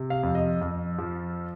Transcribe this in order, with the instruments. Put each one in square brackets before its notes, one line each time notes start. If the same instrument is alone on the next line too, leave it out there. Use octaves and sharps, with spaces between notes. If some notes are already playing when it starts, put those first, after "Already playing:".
Already playing: [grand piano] C3
F5
F2
D#5
F2
F3